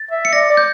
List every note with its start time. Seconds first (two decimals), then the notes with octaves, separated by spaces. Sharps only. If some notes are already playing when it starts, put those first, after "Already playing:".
Already playing: A6
0.11 E5
0.25 C#7
0.33 D5 A#6
0.50 D5
0.57 G6